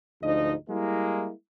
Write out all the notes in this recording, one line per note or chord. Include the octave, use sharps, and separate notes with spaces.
D2 G#2 F3 D#4 D#5
G3 G#3 A#3 E4